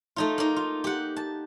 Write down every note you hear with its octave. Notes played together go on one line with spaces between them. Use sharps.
A3 D#4 F4
A#3 D#4
F4
G4 F#5
A5